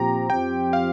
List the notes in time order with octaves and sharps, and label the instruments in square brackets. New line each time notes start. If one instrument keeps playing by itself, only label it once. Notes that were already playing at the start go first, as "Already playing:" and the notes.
Already playing: [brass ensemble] A#2 F3 C4 G4 [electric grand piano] A#5
[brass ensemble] F2 F3 C4 G4 [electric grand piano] G5
[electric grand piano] F5